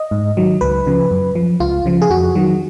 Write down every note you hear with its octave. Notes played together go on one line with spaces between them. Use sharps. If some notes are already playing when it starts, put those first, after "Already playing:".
Already playing: D#5
G#2
D#3 F#3
C#2 B4
C#3 F3
F#2
F3
C#2 F4
C#3 F3
G#4
F2 F#4
D#3 F#3